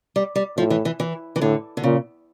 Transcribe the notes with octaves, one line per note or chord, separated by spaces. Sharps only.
G3
G3
A2 F3
E3
E3
E3
E3
A2 D3
D3
A#2 C#3